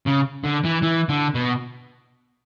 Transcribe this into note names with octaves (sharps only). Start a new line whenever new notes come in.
C#3
D3
E3
E3
D3
B2